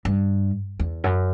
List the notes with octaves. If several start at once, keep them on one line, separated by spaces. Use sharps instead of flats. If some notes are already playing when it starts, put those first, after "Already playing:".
G2
E2
F#2